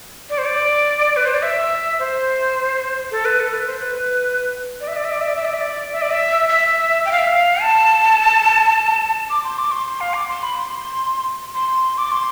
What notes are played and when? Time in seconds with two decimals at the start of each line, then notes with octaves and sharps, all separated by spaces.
0.30 D5
0.38 C5
0.46 D5
1.17 B4
1.25 C5
1.34 D5
1.42 E5
1.99 C5
3.11 A4
3.25 B4
3.40 A4
3.54 B4
3.66 C5
3.79 B4
4.81 D5
4.88 E5
4.96 D5
5.05 E5
5.12 D5
5.21 E5
5.28 D5
5.36 E5
5.45 D5
5.54 E5
5.61 D5
5.93 E5
6.02 D5
6.11 E5
6.49 E5
7.05 G5
7.12 F5
7.19 E5
7.27 F5
7.61 A5
9.30 D6
9.44 C6
9.59 D6
9.72 C6
9.86 C6
10.00 F5
10.14 D6
10.29 C6
10.43 B5
10.56 C6
11.55 C6
11.98 D6
12.12 C6